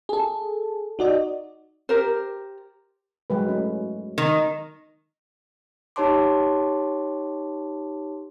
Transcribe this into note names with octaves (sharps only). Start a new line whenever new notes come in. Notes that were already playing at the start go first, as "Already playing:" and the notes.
G#4 A4
D#4 F#4 D5 D#5
G4 A#4 C5
F#3 G#3 B4
A3 C#4
D#3
D#4 G4 C#5 A5 C6 D6